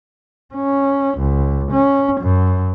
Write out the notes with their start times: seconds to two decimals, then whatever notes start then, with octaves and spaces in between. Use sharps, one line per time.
0.55 C#4
1.18 C#2
1.72 C#4
2.21 F#2